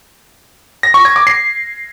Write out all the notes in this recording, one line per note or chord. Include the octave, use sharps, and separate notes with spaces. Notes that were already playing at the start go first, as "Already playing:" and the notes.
A#6
C#6
G#6
D6
C7